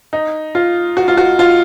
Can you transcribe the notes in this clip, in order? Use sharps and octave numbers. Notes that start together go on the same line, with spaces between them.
D#4
F4
F#4
F4
F#4
F4